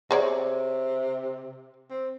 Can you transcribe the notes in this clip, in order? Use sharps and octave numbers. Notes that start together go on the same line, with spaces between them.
C3 G#4 C#5 D5
C4